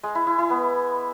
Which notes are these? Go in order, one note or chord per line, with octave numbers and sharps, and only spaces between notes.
G#3
E4
E4
E4
B3